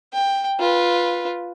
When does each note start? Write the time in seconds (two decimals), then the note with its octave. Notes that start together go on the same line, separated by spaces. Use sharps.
0.13 G5
0.60 F4 B4